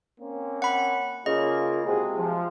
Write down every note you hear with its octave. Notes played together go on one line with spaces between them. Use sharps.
A#3 C4 C#4
F#5 B5
C#3 A#3 F4 D#5
C3 G#3 F4 F#4 G#4
F3